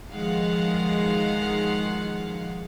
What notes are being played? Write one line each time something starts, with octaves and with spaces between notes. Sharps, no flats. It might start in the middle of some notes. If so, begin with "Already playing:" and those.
D#3 F3 G#3 F5 F#5